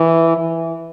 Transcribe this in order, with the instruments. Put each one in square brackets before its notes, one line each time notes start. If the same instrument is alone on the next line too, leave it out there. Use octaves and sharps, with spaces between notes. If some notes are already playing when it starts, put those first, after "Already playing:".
Already playing: [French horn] E3
E3